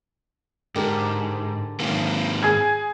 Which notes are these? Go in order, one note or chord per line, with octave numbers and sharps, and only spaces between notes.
G#2 D3 G4 A#4
G#2 D#3 A#3
G#4 G#6